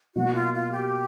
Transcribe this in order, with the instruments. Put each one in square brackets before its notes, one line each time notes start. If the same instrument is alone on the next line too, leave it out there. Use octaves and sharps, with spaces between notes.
[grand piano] B2 F#3 A#3 [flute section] F#4
[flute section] F4
F4
G4